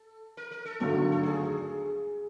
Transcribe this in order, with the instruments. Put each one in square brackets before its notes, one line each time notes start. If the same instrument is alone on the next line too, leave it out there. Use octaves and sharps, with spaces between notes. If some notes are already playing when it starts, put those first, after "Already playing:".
Already playing: [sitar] A4
A#4
A#4
A4
[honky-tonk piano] G#1 G2 D3 F#3 A3 [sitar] A4
[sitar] A4
G#4